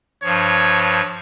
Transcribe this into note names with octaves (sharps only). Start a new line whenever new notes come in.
G2 F3 C#5